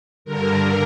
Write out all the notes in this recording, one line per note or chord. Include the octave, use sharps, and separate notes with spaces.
G2 D3 A#4